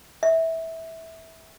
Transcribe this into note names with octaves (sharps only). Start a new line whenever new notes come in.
E5